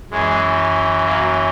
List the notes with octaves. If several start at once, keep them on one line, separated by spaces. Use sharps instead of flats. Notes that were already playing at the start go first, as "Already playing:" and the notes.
F#2 E3 G#3
F#3 A#3